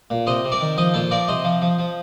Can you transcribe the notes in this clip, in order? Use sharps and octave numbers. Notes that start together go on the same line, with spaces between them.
A#2
C3 C5 D#5
C3
A#4 D5
D#3
F3 C5 D#5
A#2 A4 C5
F3 A#4 D5
C3 C5 D#5
F3
F3
F3